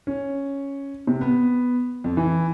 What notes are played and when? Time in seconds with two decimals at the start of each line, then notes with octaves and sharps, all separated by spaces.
0.07 C#4
1.07 C3
1.21 B3
2.04 F2
2.17 E3